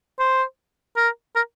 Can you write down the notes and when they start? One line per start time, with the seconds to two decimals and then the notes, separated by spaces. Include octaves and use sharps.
0.19 C5
0.96 A#4
1.36 A#4